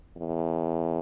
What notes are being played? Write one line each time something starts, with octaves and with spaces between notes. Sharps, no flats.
E2